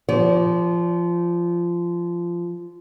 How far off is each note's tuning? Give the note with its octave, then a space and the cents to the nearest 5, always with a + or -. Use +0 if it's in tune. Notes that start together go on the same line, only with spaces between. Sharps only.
F3 -15 D5 -45